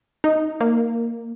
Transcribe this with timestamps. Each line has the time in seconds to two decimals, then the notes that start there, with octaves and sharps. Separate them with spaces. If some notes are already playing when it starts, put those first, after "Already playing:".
0.24 D#4
0.60 A#3